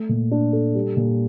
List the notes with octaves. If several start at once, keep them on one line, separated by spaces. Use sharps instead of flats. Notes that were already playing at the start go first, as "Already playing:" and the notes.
Already playing: A3
A#2
D4
A4
G3
A#2